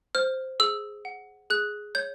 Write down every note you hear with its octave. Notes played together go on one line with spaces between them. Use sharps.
C5 F6
G#4 E6
F#5
G#4 F#6
C#5 G6